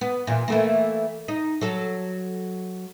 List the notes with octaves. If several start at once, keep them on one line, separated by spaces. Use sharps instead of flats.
B3
E2 A#2
E3 A3 A#3
D#4
F#3 A4